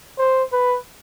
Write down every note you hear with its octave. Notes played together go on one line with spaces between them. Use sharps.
C5
B4